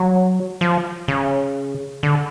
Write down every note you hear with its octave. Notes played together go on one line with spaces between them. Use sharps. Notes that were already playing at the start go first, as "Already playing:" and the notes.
Already playing: F#3
F3
C#3
D3